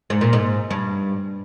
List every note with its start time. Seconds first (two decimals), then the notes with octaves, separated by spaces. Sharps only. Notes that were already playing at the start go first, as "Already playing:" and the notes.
0.10 G#2
0.21 A#2
0.33 G#2
0.70 G2